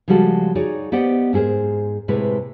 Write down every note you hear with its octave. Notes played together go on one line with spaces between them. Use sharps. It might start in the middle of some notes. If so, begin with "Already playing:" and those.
C#3 F3 G3 G#3 F#4 A4
D#4 F#4 G#4 C#5 D5
B3 G4 C5 D5 D#5 F#5
G#2 E4 G#4 A#4 C5
A2 C3 G#3 E4 B4